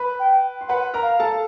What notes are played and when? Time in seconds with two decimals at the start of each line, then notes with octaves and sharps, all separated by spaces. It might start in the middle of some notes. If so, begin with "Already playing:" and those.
Already playing: B4 B5
0.20 G5
0.61 C6
0.68 B4 F#5 B5
0.94 A#4 A#5
1.03 F5
1.20 A4 A5